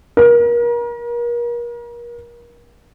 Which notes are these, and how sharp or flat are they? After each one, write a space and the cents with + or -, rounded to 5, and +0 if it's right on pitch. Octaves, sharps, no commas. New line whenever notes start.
A#4 +35